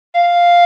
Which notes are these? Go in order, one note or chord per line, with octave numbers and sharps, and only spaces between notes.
F5